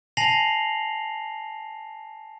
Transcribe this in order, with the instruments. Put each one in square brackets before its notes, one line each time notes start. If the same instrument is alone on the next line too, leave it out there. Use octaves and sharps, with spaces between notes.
[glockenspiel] G#5 A5 A#6 C7 F7 F#7